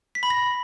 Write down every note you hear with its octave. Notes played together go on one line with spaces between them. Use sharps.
B6
B5
A#6